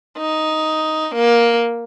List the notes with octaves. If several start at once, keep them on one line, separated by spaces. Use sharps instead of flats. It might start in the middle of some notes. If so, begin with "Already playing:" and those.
D#4
A#3